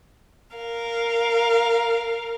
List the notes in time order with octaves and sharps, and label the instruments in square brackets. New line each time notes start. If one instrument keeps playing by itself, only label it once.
[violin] A#4 F5